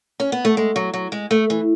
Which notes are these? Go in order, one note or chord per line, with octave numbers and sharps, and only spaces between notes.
C#4
B3
A3
G#3
F#3
F#3
G#3
A3
E3